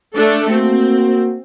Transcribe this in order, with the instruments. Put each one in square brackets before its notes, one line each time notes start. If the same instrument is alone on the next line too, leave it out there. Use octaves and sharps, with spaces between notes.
[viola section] A3 D4 A4
[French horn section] A#3 F#4 [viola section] C4